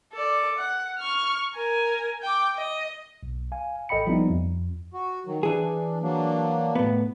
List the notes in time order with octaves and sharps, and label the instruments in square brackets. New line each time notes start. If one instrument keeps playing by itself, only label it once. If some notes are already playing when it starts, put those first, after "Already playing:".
[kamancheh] A4 D5
F#5
C#6 F6
A#4 G#5
G5 D6
D#5
[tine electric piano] B1
F5 G#5
A1 A4 D#5 G5 B5 C#7
F3 G3 B3 C4 D#4 E4
F2
[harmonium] F#4
D#3 F#3
[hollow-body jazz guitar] E3 G#4 [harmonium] D4
[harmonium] F#3 A#3 D4
[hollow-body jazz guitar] A2 B3